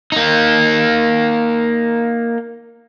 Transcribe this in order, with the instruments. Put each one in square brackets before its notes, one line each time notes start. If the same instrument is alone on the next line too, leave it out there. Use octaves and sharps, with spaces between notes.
[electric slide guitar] A#3 D#4